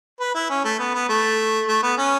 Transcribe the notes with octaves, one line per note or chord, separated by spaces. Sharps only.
B4
E4
C#4
A3
B3
B3
A3
A3
B3
C#4